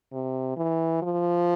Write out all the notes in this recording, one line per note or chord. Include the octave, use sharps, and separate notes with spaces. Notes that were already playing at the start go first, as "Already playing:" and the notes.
C3
E3
F3